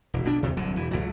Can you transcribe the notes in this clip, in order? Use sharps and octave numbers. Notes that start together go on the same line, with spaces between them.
E1
A#1 B2 D4
E2 C3
D1 C2 D3 F#3
E1 E3
C#2 A2 F#3